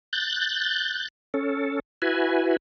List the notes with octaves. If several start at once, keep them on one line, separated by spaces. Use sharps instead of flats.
F#6 G6 A6
C#4 A4
E4 F#4 B4 G#5